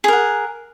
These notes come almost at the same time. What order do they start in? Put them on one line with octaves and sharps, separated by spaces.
G#4 A#4 F#5